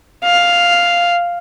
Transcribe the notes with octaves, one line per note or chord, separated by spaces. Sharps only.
F5